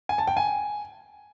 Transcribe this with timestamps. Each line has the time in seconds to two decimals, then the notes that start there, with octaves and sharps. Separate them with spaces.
0.09 G#5
0.18 A5
0.27 G5
0.37 G#5